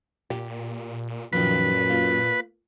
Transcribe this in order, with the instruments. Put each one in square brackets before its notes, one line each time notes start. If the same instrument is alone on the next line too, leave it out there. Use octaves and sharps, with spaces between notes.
[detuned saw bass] A#2 [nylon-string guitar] G4
[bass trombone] F#2 [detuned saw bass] A#2 [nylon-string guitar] D#3 F3 [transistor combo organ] B4
[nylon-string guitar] A#3 F4